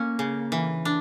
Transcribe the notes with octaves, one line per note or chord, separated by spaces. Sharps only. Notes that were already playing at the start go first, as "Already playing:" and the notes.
Already playing: A#3 C#4
C#3
E3
D4